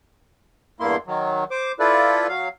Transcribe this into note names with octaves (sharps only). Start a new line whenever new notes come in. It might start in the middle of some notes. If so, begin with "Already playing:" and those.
E2 G2 A#3 E4 C6
D#3 F#3
C5 D6
E4 F4 A4 B4 D5
F#3 F5